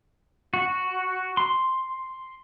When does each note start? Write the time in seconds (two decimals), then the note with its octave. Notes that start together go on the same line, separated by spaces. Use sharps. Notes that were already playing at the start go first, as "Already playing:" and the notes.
0.54 F#4
1.37 C6